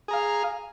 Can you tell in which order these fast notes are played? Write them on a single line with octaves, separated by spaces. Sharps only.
G#4 A#5 F5